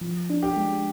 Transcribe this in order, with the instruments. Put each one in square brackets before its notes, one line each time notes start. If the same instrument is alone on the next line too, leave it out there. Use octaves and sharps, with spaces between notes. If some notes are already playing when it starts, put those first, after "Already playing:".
[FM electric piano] F3
D4
[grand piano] G4
[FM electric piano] G#3